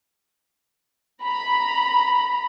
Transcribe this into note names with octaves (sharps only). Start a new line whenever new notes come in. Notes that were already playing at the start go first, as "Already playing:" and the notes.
A#5 B5